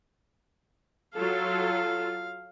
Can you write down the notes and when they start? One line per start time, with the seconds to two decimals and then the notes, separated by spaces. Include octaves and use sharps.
1.15 F#3 F4 A4 F5